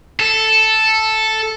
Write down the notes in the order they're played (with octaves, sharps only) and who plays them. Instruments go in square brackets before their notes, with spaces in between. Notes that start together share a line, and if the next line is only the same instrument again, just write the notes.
[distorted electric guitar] A4